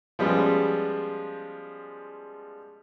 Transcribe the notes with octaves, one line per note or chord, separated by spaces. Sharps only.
F3 G3 G#3 B3 C#4